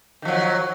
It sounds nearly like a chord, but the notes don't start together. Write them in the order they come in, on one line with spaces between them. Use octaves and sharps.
D#3 F3 F#3